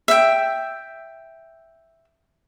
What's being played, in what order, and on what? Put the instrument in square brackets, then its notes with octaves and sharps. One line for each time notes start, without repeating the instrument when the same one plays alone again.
[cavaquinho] E5 G5